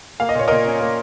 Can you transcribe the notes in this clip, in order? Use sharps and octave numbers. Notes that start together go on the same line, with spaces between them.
A#3 F5
D#5
A#2 C#5
A#2 A#4 D#5
C#4
A#3